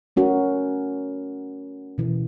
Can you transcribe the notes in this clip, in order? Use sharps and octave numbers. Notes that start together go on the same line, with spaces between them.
A3 C#4 F#4 A#4
B2 E3